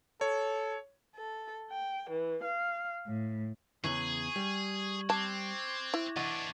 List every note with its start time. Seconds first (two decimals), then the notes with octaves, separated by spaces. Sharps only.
0.21 A4 C#5
1.15 A4
1.69 G5
2.10 E3
2.44 F5
3.07 A2
3.84 E2 C#3 E3 G#4 C#6 G#6 F#7
4.36 G3
5.10 C4 A5 D6 F#6 G#6
5.94 E4
6.17 E3 D4 D#5 F#5 C#6 A6 D#7